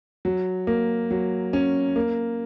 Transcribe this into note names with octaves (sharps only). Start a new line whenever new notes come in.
F#3
A#3
F#3
C#4
A#3